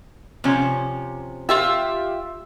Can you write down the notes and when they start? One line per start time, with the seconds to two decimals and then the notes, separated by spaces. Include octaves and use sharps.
0.44 C3 F3 C#4
1.49 F4 G4 E5 E6